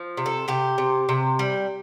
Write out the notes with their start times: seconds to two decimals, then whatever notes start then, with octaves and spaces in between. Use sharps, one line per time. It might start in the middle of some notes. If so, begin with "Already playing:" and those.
Already playing: F3
0.17 C3
0.26 A4
0.48 C3 G4
0.78 C3
1.09 C3
1.39 G3